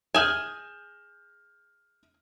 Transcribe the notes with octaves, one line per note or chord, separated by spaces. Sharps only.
G#4 G#5 F6 G6 E7